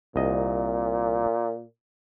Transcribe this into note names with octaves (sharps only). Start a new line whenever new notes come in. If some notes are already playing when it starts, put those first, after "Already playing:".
C2 A#2 D#5